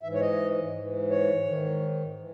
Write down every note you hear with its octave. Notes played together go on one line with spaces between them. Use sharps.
G#2 E3 E5
C#5
D#5
G#2 E3
C#5
G#2 D#3
E3